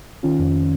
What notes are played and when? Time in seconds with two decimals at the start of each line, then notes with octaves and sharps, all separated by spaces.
0.23 D#3 C#4 F4
0.39 F2